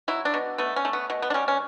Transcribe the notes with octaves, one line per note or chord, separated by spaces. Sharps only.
F#3 E4
D4
B2
A3 B3
C#4
A3
B3
B2
B3
D4
G3 C#4
C#4